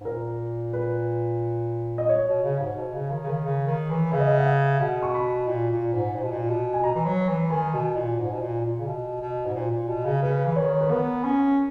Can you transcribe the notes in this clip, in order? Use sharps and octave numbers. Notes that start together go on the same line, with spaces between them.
G#2
A#2 A#4
B4
D#5
C#5
B2
C#3
G#2
B2
C#3
D#3
C#3
D#3
C#3
D#3
E3
C#3 E5
D#5
E5
F#5
E5
B2 F#5
C#6
B5
A#2
A#2
G#2
A#2
B2
A#2
B2
G#5
B2 A#5
E3
F#3
E3
D#3 G#5
B2
A#2
G#2
B2
A#2
A#2
C#3
B2
B2
G#2
A#2
A#2
B2
C#3
C#3 B4
E3
D#3 C#5
B4
B3 A#4
C#4